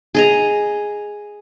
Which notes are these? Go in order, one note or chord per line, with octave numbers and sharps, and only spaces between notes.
G#4 D#5 A#5